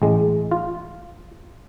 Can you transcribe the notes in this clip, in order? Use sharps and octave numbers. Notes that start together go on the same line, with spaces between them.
A1 G#3
F4